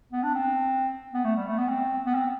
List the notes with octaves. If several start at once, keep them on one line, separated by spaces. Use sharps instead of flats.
B3
D4
C4
B3
A3
G3
A3
B3
C4
B3
C4